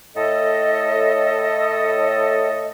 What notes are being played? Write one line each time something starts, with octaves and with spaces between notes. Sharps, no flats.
A2 A4 D#5